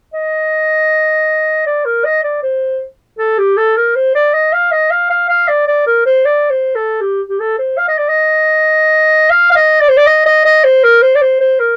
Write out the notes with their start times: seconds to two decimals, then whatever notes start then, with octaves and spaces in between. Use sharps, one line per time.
0.14 D#5
1.66 D5
1.85 A#4
2.05 D#5
2.23 D5
2.43 C5
3.19 A4
3.38 G4
3.57 A4
3.76 A#4
3.96 C5
4.15 D5
4.33 D#5
4.53 F5
4.72 D#5
4.91 F5
5.10 F5
5.29 F5
5.48 D5
5.68 D5
5.86 A#4
6.06 C5
6.25 D5
6.50 C5
6.75 A4
7.01 G4
7.29 G4
7.40 A4
7.59 C5
7.78 F5
7.88 D#5
7.98 D5
8.08 D#5
9.30 F5
9.51 F5
9.56 D#5
9.81 D5
9.89 C5
9.97 D5
10.07 D#5
10.26 D#5
10.45 D#5
10.64 C5
10.84 A#4
11.02 C5
11.15 D5
11.21 C5
11.40 C5
11.60 A#4